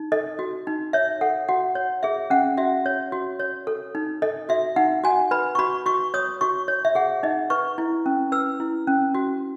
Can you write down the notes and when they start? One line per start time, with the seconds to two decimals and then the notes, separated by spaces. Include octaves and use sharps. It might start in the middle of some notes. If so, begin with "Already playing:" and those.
Already playing: D#4
0.12 A4 D#5
0.39 F#4
0.67 D#4
0.93 C#5 E5
1.21 A4 F#5
1.49 F#4 F#5
1.75 C#5
2.03 G#4 E5
2.30 C#4 F#5
2.57 F#4 E5
2.86 C#5
3.12 F#4
3.39 C#5
3.67 A4
3.95 D#4
4.22 A4 D#5
4.49 F#4 E5
4.76 D#4 F#5
5.04 F#4 G#5
5.31 B4 B5
5.55 C#6
5.59 F#4 B5
5.86 F#4 C#6
6.14 C#5 D#6
6.41 F#4 C#6
6.68 C#5
6.85 E5
6.95 G#4 F#5
7.23 D#4 D#5
7.50 B4 C#6
7.78 E4
8.06 C#4
8.32 B4 E6
8.60 E4
8.87 C#4
9.15 F#4